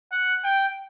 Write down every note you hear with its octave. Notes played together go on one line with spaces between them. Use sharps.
F#5
G5